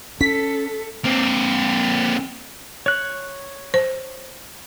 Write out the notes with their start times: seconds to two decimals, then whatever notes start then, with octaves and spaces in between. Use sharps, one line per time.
0.21 C#4 A4 B6
1.04 A#3 C4
2.86 C#5 F#6
3.74 C5